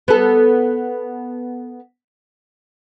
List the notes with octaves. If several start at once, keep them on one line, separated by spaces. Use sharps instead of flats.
B3 A4